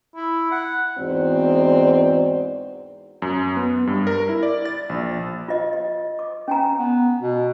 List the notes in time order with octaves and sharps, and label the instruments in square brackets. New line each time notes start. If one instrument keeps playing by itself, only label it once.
[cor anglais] E4
F#5
[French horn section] E2 G#2 C4 F#4 D5
[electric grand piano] F#2
B3
G2
A#4
E4
D5
A6
A#1
[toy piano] F4 D#5
D#5
D6
C#4 G#5 A#5
[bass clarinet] B3
B2